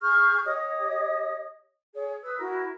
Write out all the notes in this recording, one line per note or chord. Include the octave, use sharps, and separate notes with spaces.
G#4 C#6 F6 G6
G4 C#5 D#5 D#6
G#4 C#5
B4 D#6 E6
E4 F#4 A#4